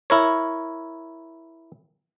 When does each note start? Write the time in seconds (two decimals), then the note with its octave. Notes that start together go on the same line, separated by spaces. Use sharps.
0.10 E4 A#4 C#5